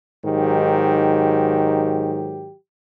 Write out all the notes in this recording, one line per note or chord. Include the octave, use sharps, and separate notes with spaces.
G#2 D#3 F#3 G4